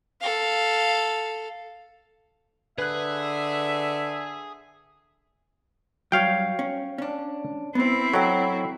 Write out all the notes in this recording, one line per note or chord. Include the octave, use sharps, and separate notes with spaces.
A4 F5
D3 G#4 B4 E5 F#6
G2 F#3 C#5 F5 G5
C#4
C#4 D4
B3 C4 E4 C5
F#3 A4 D#5 G5